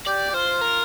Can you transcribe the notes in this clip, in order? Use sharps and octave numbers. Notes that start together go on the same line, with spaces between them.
G4 D5
G4
F4 C5
A#4